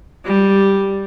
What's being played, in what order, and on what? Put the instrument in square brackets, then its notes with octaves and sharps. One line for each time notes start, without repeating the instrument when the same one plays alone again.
[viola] G3